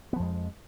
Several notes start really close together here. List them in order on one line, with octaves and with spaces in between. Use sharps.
B3 F3 F2 G#3